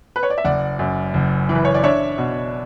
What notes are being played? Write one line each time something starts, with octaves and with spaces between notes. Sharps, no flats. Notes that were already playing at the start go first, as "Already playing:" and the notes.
B4
C#5
D5
E5
F#1 D5 F#5
F#2
F#1
E3
B4
C#5
D5
D4 C#5 E5
B2